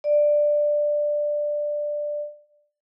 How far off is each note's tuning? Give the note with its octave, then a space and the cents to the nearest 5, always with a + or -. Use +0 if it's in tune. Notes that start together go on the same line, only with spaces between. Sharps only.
D5 +10